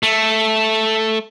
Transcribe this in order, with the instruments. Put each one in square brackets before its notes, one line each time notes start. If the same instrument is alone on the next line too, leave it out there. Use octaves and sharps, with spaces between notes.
[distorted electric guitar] A3